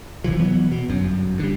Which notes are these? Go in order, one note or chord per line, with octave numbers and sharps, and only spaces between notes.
F1 C3 E3 F3
E3 F#3 A#3 B3
B2
G1 F#2
D3 G3